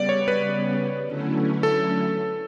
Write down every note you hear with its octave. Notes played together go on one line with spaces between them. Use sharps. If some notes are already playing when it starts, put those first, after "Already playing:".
Already playing: C#3 G3 B3 D5
C#5
B4
D3 F#3 A3 C#4 E4
A4